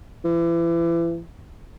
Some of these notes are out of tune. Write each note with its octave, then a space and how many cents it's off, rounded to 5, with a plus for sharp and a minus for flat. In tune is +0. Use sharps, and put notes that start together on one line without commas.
E3 +35